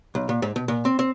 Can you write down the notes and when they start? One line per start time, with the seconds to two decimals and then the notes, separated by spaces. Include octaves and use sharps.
0.15 B1
0.29 A#2
0.42 G#2
0.56 B2
0.68 A#2
0.85 C4
0.99 C4